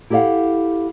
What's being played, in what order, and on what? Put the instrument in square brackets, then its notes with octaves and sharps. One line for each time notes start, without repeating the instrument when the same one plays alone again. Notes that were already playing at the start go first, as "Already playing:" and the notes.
[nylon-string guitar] E4 G4 A4 D5 F5 F#5